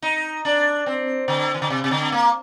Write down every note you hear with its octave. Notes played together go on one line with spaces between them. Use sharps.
D#4
D4
C4
D3
D#3
D3
C3
C3
D3
A#3